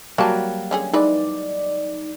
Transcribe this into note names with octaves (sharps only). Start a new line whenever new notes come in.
F#3 G3 A#3 F#4 A5
D3 C#4 G#4
E3 G#3 D#4 B4 D5